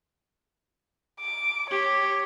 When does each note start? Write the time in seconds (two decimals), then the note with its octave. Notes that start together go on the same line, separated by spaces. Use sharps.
1.21 D6
1.71 G4 C#5